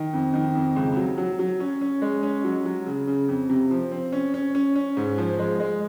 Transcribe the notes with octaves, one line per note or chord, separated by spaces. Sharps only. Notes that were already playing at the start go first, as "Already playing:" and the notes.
Already playing: D#3
F2
D#3
F2
C#2
F#3
F#3
F#3
C#4
C#4
G#3
C#4
F#3
F#3
C#3
C#3
F2
C3
F3
C4
C#4
C#4
C#4
C#4
G#2
F3
G#3
G#3